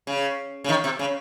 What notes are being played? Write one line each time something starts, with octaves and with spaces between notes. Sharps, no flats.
C#3
C#3
D#3
C3
C#3